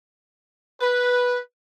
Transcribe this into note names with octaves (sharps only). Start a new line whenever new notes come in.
B4